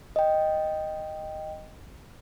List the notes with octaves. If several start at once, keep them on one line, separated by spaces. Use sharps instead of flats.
D#5 G5